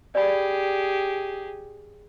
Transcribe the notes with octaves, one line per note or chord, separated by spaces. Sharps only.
G4 G#4 D5 B5